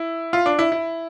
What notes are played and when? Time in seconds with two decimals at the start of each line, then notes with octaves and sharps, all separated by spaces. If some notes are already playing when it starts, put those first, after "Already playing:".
Already playing: E4
0.33 F4
0.46 D4
0.59 E4
0.72 E4